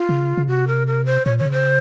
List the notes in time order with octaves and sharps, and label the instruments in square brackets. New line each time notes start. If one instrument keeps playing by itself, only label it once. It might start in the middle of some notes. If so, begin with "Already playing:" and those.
Already playing: [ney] F4
[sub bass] C#3
C#3
[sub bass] C3 [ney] F#4
[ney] A#4
A#4
C5
[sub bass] A#2 [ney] C#5
[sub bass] D#3 [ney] C#5
[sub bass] C#3
[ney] C5